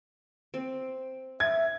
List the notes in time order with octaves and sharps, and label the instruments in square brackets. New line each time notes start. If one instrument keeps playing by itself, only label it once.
[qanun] C4
[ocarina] E5 [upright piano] G#6